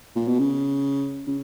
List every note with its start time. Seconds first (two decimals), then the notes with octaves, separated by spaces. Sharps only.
0.15 A#2
0.28 B2
0.39 C#3
1.27 C#3